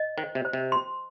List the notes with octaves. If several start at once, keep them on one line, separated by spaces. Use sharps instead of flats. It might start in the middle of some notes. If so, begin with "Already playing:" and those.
Already playing: D#5
D#3 C5
C3
C5
C3
C6